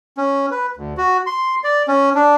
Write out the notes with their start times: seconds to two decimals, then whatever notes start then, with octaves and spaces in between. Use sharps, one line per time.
0.18 C#4
0.51 B4
0.77 D2
0.98 F#4
1.27 C6
1.64 D5
1.88 C#4
2.15 D4